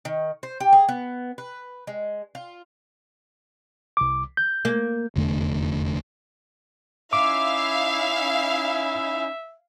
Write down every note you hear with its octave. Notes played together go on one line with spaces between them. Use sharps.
D#3
C5
G4
G#4
B3
B4
G#3
F4
C2 D6
G6
A#3
F1 E2 D3 A3
C#4 D#4 E4 E5 F5 D6